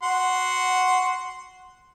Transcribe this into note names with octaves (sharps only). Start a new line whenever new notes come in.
F#4 F#5 C6